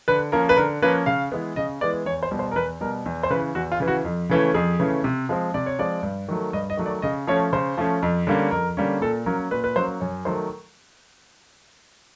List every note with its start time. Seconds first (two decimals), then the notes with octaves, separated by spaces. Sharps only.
0.08 D3 B4
0.32 F3 A#3 C#4 A#4
0.49 B4
0.56 D3 A#4
0.82 F3 A#3 C#4 B4
1.06 C#3 F5
1.32 E3 G#3 B3
1.56 C#3 D#5
1.81 E3 G#3 B3 D5
2.06 E2 C#5
2.23 C5
2.31 B2 G3
2.39 C5
2.51 A#4
2.56 E2 B4
2.81 B2 G3 A#4
3.06 E2
3.23 C5
3.30 C#3 B4
3.35 E3
3.55 E2 F#4
3.72 F4
3.80 C#3 E3
3.88 F#4
4.05 F2
4.29 C#3 E3 A3 C#4
4.54 F2 G#4
4.80 C#3 E3 A3 C#4
5.04 C3
5.29 F3 G#3 C4
5.54 C3 D5
5.66 C#5
5.79 F3 G#3 C4 D5
6.03 G2
6.29 D#3 F#3 A3
6.53 G2 D#5
6.70 D#5
6.77 D#3 F#3 A3
6.86 D5
7.02 C#3 D#5
7.27 F3 A3 C#4 C#5
7.53 C#3 C5
7.77 F3 A3 C#4
8.02 F2
8.27 D3 G3 A#3 C#4
8.51 F2 A#4
8.77 D3 G3 A#3 C#4
9.02 A#2 A4
9.26 F#3 A#3 C#4 A#4
9.51 A#2 B4
9.64 B4
9.76 F#3 A#3 C#4 C5
10.00 F#2 C#5
10.25 D#3 F#3 A3 C5